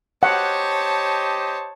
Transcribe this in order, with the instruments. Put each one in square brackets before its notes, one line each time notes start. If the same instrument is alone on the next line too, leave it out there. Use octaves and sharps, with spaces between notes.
[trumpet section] G4 C5 D#5 [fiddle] C#5 A5 [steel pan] F#5